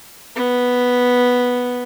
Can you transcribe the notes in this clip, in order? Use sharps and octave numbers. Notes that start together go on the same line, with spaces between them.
B3